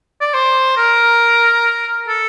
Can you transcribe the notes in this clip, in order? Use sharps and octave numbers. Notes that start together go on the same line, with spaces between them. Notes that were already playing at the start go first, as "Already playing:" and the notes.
D5
C5
A#4
A4